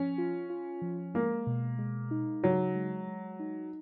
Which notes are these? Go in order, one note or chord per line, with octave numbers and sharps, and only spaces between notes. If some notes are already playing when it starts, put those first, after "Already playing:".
Already playing: F3 C#4
F4
F4
F3
G#3 A#3
B2
G#3
D#4
C#3 F#3
G#3
G#3
D#4